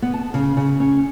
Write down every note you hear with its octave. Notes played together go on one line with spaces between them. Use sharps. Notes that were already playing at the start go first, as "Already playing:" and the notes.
B3
A5
C#3
C#3
C#4